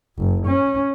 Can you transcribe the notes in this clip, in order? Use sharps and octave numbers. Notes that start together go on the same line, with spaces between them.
F#1
C#4